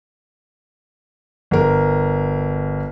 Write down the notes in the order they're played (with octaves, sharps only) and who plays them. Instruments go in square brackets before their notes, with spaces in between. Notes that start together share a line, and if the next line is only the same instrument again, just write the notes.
[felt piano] G1 A#4